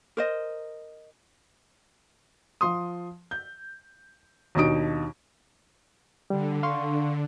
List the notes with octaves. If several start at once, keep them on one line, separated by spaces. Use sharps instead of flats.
A#4 C5 D#5
F3 C6 D#6
G6
D#2 B2 D4 D#4 D#6 D7
D3 G3
F5 C6 C#6